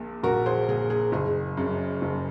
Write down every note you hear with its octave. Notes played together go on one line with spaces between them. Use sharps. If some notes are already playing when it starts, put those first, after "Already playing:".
Already playing: A#1 A#2
A#1 F#4 A#4
G#4 C5
A#2 G#4
G#4
F#1 G#4
F#2 C#3
F#1